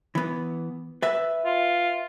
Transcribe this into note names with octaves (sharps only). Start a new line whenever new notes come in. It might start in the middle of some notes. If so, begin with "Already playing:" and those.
E3 B3
B4 E5
F4